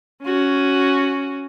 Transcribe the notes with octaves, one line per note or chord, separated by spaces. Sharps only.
C#4 F#4